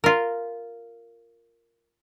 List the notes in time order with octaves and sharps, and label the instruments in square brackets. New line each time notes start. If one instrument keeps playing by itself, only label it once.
[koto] F4 A#4